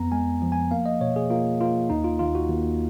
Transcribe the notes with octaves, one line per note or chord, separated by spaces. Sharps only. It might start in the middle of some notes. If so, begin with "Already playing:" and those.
Already playing: F2 B3 A#5
G#3 G#5
F3
G#5
A#3 F5
D#5
B2 C#5
G#4
A#3 F4
A#3 F4
D#2 D#4
F4
D#2 F4
F#4
D#2